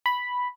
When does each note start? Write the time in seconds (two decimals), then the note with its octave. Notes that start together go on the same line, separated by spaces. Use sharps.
0.06 B5